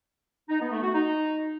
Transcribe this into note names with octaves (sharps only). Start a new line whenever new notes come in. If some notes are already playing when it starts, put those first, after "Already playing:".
D#4
B3
A3
F#4
D#4